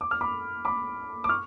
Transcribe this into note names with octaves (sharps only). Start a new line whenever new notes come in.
D6
F6
B5 D6
B5 D6
D6
C#6 F6